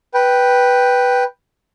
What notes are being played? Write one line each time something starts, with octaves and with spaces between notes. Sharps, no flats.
B4 G5